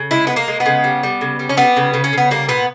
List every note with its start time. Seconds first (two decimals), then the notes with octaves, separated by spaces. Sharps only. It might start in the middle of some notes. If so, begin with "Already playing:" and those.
Already playing: C#3
0.11 G#3 E4
0.27 G#3 B3
0.36 A#3
0.48 G#3
0.60 B3
0.66 C#3
0.84 G3
1.03 G3
1.21 C#3
1.39 G3
1.49 C#4
1.57 G3 B3
1.76 C#3
1.93 C#3
2.04 C#4
2.13 C#3 B3
2.31 G3 A#3
2.48 A#2 B3